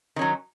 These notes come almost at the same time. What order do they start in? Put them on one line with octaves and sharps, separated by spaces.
D#3 C#4 F#3